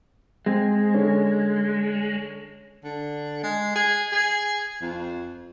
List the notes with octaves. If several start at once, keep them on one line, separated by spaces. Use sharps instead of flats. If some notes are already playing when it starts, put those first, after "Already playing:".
G#3 C4
D3 C#4
D3
G#3
G#4
G#4
F2